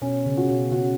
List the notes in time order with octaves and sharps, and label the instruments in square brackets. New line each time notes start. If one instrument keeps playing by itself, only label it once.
[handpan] B2 [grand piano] C#4
[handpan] C#3
[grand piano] F#4
[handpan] B2
[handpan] C#3 [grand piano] F#4